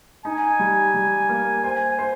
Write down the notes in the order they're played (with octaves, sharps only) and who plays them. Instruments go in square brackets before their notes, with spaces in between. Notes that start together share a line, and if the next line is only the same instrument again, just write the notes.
[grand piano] D#4 [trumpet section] G#5
[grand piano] G3
G3
A#3
[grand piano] C5 [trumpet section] G#5
[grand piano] C5